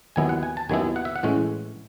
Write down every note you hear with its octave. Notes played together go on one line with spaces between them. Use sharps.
D#2 D#3 F#3 B3 E4 G#5
F#5
G#5
A5
D#2 D#3 F#3 B3 E4 G#5
F#5
E5
F#5
A2 E3 G#3 C#4